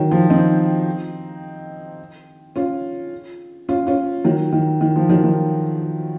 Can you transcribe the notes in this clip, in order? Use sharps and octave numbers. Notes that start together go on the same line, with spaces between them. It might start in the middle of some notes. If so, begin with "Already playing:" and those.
Already playing: D#3 F#3
F3
C4 D#4
C#4 F4
C#4 F4
C#4 F4
D#3 F#3
D#3
D#3
F3
D#3 F#3
D#3